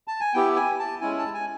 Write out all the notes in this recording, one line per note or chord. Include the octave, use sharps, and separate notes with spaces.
A5
G#5
B3 E4 G4 G5
G#5
A5
G#3 C#4 E4 G#5
A5
G#5